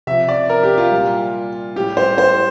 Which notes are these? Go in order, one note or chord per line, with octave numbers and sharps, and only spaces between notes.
C3 F3 E5
D5
A#4
G4
F4
A#2 G3
A2 G3 G4
C5
C5